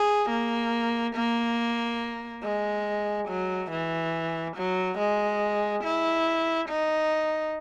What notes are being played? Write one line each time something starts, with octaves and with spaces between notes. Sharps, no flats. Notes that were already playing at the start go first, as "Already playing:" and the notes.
Already playing: G#4
A#3
A#3
G#3
F#3
E3
F#3
G#3
E4
D#4